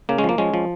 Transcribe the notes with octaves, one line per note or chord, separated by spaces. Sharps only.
C#3 A#3
G#3 C#4
F3 A#3
F3 G#3 C#4
F3